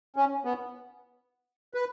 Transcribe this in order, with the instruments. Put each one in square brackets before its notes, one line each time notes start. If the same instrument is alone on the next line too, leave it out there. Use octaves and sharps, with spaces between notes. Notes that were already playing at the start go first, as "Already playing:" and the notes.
[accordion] C#4
B3
B4